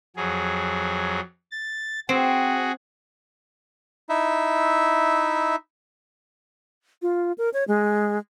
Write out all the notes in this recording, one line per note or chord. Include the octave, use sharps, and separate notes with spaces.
F2 F#3 G#4
A6
C4 F#4 G#4
D#4 E4 E5
F4
A#4
C#5
G#3